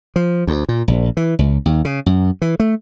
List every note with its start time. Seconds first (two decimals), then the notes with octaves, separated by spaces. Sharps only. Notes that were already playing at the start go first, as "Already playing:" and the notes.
0.16 F3
0.47 D2
0.69 A#2
0.88 A#1
1.17 E3
1.39 C#2
1.66 D#2
1.85 C#3
2.06 F#2
2.42 E3
2.60 A3